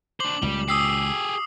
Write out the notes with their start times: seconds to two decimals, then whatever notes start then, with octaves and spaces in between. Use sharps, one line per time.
0.20 D4 C5 D6 F#7
0.43 C#2 A#2 G3
0.69 G4 G#4 D#6 E6 C7